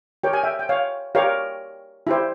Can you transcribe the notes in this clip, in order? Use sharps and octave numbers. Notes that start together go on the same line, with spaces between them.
G4 A#4 C#5 G5
G#5
E5 G5
G5
C#5 F5
G4 A#4 C#5 F5
E4 G4 C5